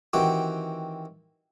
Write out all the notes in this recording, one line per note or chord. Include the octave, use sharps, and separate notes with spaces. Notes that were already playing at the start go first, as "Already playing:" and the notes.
D#3 E3 C4 F#4 G4